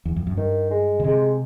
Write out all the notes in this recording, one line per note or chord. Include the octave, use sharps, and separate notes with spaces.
E2
F2
F#2
G2 D#3
G#3
C#3
C3 G#3